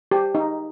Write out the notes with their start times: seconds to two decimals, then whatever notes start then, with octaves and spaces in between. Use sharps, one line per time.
0.11 G4
0.35 D#4